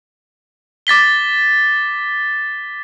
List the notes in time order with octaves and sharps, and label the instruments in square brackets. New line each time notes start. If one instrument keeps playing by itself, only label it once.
[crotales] D6 A6 B6 G7